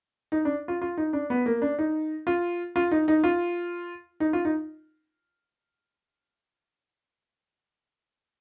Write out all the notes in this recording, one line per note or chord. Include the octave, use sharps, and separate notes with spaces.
D#4
D4
F4
F4
D#4
D4
B3
A#3
D4
D#4
F4
F4
D#4
D#4
F4
D#4
F4
D#4